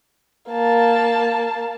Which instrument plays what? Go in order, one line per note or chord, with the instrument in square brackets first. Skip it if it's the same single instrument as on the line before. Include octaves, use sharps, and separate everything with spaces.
[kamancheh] A#3 A5